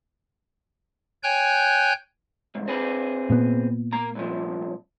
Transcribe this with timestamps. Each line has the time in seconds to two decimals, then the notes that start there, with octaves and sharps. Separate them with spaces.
1.23 C#5 G5 G#5 F#6 G6
2.55 C2 G#2
2.67 C4 G#4 B4
3.30 A#2 B3
3.93 A#3 A#5
4.15 C2 F#2 F3